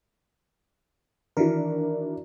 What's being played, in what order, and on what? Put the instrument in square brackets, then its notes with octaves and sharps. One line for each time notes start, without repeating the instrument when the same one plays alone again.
[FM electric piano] D#3 E3 A#4 [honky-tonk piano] D4 E4 F#4